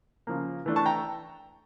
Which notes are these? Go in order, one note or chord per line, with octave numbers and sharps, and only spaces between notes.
C#3 F3 A#3
E3 A3 D4
A5 C#6
G5 A#5